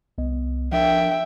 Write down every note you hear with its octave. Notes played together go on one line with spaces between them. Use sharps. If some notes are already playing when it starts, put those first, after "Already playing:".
C2 B3 D#5
F3 D4 A#4 E5 G5